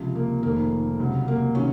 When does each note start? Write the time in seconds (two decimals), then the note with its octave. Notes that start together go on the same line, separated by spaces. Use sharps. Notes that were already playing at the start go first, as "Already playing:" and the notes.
Already playing: C#2 C3 F3
0.15 A#3
0.42 F1 F2 D#3 A#3
1.00 C#2 C3 F#3
1.28 A#3
1.55 C3 D#3 F#3 C#4